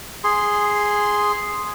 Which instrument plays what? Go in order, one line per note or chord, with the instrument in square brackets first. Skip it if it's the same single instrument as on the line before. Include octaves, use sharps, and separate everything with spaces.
[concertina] G#4 C6